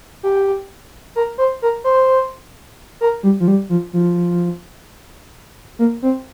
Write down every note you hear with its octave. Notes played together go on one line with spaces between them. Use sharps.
G4
A#4
C5
A#4
C5
A#4
G3
F3
G3
F3
F3
A#3
C4